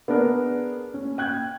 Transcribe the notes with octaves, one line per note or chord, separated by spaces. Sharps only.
B3 D4 G#4 A#4
C#4
G5 F#6 G#6